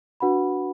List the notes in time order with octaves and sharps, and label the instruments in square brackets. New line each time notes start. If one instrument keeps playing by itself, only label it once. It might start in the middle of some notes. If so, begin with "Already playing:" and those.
[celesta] D4 F#4 B4 F#5 B5